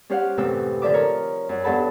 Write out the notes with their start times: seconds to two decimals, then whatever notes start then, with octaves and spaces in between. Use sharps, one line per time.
0.09 G3 C#4 G4 C5 F5 F#5
0.37 F#2 A2 C3 E3 G5 E6
0.82 D3 F3 A4 D5 E5 D6
0.94 A#4 C#5
1.49 F#2
1.64 E2 G2 A4 F#5 A5 B5